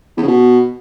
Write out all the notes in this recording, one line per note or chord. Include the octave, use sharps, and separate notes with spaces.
E2
C#3
B2